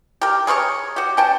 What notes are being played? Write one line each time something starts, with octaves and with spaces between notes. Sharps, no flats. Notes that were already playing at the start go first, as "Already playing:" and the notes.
G4 A#4
G#4 A#4 C5 C#5
F#4 G4
C#4 G5 A5